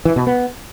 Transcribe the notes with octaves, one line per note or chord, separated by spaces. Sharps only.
E3
B2
B3